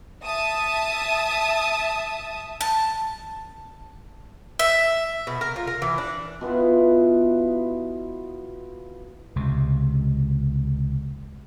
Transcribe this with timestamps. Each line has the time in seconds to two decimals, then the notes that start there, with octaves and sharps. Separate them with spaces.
0.24 E5 A5 D#6
2.61 A5
4.59 E5
5.27 B2
5.41 A#4
5.56 F4
5.67 A#4
5.82 E3
5.98 D4
6.41 B2 B3 E4 F4
9.36 C#2 C3